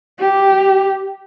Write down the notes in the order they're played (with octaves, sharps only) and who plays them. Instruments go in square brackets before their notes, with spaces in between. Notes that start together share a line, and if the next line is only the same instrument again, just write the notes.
[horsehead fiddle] G4